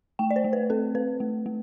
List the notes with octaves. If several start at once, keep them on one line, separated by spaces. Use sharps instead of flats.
A3 G5
D5
C5
A3
B4
C4 A4
C4 B4
A3
A3